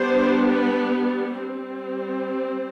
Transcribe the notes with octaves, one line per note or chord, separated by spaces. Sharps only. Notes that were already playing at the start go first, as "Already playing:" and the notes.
Already playing: G3 B3 D4 C5
B4
G3 C4